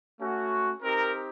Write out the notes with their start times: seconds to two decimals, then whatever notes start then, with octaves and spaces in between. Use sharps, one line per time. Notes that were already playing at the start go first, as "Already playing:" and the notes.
0.18 A3 C#4 F#4
0.82 C4 D#4 G4 A#4